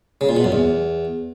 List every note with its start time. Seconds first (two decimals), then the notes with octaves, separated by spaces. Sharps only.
0.21 C#3
0.29 A#2
0.37 B2
0.44 F#2
0.52 E2